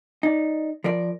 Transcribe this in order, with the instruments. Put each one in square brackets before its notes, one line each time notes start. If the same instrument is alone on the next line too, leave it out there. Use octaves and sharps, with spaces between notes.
[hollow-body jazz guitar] D#4 D5
F3 A#4 D5